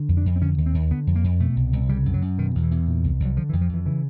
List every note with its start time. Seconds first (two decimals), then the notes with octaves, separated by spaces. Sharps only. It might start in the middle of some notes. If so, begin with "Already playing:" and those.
Already playing: D3
0.09 F2
0.17 D4
0.26 F2
0.36 C4
0.42 D3 C#4
0.58 D#2
0.66 C4
0.74 D#2
0.91 D3 B3
1.07 F2
1.16 A#3
1.24 F2
1.40 B2 A3
1.56 C2
1.73 C2
1.89 C#3 G3
2.06 F#2
2.14 F#3
2.22 F#2
2.38 B2 D#3
2.55 E2
2.63 E3
2.71 E2
2.87 A#2
3.04 C2
3.20 C2
3.25 F#3
3.36 D3 F3
3.49 E3
3.53 F2
3.61 F3
3.69 F2 E3
3.86 C#3 E3